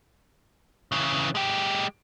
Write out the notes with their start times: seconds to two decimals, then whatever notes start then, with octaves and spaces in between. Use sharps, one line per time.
0.92 C#3 E3
1.35 G#3 G4